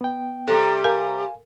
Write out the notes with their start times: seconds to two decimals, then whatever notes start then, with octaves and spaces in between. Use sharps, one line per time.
0.01 B3 G5
0.48 C3 G3 G4 A4
0.84 A#4 F5 G#5